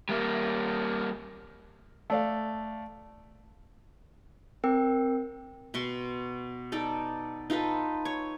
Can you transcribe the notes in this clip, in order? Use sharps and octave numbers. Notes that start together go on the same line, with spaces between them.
G3 A#3
A3 D5 F5
C4 A#4 G5 E6
B2 C6 C#6
D#4 A4 D5
D#4 F4 A4 B4
C#5